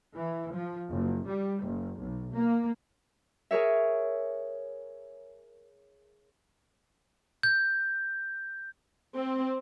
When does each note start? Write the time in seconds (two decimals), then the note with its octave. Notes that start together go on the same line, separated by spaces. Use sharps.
0.15 E3
0.53 F3
0.89 F#1
1.27 G3
1.64 F#1
1.98 B1
2.33 A#3
3.51 G#4 A#4 C#5 E5
7.43 G6
9.17 C4